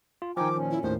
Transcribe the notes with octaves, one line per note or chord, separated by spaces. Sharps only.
F4
D#3 F3 D#4 G5 G#5 D6
A#2 C#4
E4
D#2 A2 D#3 C5